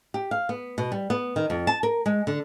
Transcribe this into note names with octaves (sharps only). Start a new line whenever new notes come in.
G4
F5
B3
B2
G3
B3
D#3
F2
A5
A#4
G#3
D3